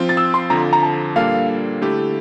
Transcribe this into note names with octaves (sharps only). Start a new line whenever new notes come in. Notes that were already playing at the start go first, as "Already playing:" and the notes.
Already playing: F3 C4 F4
A6
E6
C6
F2 D3 F3 A#5
A#5
A5
A#2 G3 A#3 D4 A4 F5
D3 A3 E4 G4